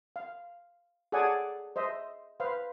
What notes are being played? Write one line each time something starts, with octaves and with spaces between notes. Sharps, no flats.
F5
G#4 A4 C#5 D5 F#5 G#5
C5 D#5 E5
B4 C5 F5